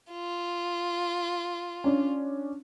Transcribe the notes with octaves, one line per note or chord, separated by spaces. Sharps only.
F4
C#4 D4